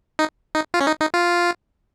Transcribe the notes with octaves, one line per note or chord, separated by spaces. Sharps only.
D#4
D#4
F4
C#4
D#4
D#4
F4